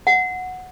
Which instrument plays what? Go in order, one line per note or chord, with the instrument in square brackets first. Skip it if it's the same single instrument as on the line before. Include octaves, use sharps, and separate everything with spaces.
[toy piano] F#5